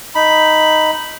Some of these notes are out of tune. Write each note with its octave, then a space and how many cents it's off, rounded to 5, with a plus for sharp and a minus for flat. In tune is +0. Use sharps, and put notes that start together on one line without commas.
D#4 +0 B5 +0